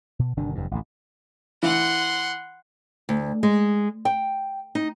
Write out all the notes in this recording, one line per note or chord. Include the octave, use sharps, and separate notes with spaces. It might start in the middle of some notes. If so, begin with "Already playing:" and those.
B2
G1 C3 D#3 D4
F1 E2 G2
A1 D2 A2
E3 F#5 C6
D2
G#3
G5
D#4